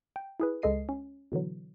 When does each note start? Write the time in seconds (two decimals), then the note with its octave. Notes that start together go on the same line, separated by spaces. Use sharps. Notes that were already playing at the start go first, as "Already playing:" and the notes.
0.16 G5
0.40 E4 G#4 B4
0.62 C#2 G#3 A4 D#5 C7 D#7
0.89 C#4
1.32 B2 D3 E3 F#3